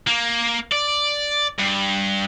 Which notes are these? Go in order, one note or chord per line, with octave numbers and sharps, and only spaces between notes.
A#3
D5
G2